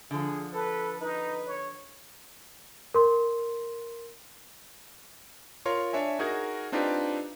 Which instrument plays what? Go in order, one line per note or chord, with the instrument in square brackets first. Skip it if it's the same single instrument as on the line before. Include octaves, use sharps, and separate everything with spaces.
[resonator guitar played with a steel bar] D3 F3 [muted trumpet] G#4
[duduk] A4 [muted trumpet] B4
[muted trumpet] D#4 [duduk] B4
[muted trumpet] C#5
[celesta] A#4 C6
[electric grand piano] F4 A#4 C#5 C6
D4 C#5 E5 G#5
D#4 F#4 G#4 A#4 G#6 A#6
C4 D4 D#4 F4 G4 B4